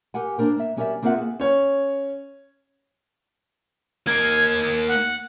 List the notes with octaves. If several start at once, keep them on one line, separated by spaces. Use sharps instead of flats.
G4 A#4 F#5 G#5
A#3 D4 A#4 C5
A#3 E5
F#3 C#4 G4 A#4 D5 E5
A#3 C4 F4 A#4 E5 F#5
G#4
C#4 C#5
A#3 D#4 G#6
F#5